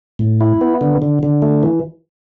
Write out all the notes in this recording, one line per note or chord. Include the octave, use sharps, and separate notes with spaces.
A2
E4
B3
D3
D3
D3
A3
E3